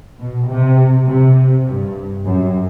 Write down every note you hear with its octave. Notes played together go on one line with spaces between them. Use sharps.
B2
C3
C3
G2
F#2